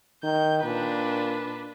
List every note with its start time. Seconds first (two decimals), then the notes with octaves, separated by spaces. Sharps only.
0.24 D#3 G6
0.63 A#2 D4 B4